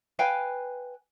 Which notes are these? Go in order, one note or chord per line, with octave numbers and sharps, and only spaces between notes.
B4 F5 G5 G#5